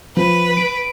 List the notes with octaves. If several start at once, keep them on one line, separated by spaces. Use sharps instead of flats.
F3 B4
D7